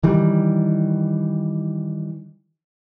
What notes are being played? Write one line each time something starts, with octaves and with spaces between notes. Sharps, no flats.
D#3 E3 G3